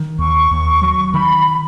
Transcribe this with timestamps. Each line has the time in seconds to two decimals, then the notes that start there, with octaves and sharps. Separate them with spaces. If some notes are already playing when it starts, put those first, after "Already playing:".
Already playing: D#3
0.19 D#2 C#6
0.51 D#2
0.82 F#3
1.13 D#3 B5